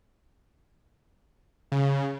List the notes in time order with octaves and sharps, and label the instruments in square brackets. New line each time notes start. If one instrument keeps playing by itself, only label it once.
[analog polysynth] C#3